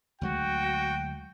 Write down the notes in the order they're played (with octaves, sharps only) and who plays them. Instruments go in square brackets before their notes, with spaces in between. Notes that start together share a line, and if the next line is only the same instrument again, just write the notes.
[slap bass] D2 F#3 G#3 [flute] F#4 [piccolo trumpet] G5